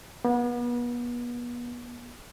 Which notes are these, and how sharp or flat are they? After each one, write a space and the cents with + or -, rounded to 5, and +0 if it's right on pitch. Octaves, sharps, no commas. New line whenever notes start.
B3 -35